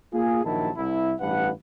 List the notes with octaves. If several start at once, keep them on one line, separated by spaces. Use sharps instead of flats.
A#3 F4 G#4
A#1 D#3 F#3 E4 A5
C2 E4
A1 G2 B4 F#5